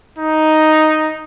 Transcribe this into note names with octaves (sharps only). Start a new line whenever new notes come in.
D#4